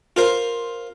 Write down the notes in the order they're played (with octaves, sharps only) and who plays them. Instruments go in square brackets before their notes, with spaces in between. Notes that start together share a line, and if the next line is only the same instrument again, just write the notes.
[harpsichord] F4 A#4 C5